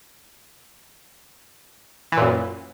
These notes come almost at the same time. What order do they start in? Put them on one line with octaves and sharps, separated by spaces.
E3 A#2 F#2